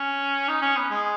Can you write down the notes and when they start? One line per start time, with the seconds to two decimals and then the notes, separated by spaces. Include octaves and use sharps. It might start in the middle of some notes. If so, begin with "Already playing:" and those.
Already playing: C#4
0.49 D#4
0.62 C#4
0.77 B3
0.90 G#3